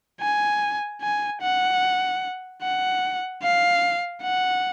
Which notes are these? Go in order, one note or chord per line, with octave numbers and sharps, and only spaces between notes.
G#5
G#5
F#5
F#5
F5
F#5